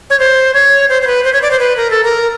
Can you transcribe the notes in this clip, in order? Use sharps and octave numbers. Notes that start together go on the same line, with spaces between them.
C#5
C5
C#5
C5
C5
B4
C5
C#5
D5
C5
B4
A#4
A4
A#4